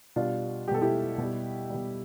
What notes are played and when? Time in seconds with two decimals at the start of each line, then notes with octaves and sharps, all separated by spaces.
0.16 B2 G3 D4 F4
0.67 G3 G4
0.71 B2 A4
0.81 E4 G4
1.18 B2 G3
1.70 B2 G3